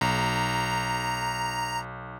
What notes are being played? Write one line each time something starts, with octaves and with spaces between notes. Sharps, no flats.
B1 A#5